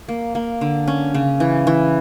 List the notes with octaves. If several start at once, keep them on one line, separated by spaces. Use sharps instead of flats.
A#3
A#3
D3
C#4
C#3
E3
E3